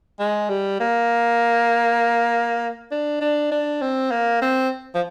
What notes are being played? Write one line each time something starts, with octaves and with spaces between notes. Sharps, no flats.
G#3
G3
A#3
D4
D4
D4
C4
A#3
C4
F3